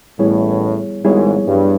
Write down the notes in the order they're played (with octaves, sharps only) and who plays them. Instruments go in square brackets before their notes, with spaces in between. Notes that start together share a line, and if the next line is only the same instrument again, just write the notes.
[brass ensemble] A1 A2 [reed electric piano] G3 B3 E4 G#4 C#5
[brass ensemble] G#1 G#2 [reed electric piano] G3 B3 E4 G#4 C#5
[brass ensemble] G2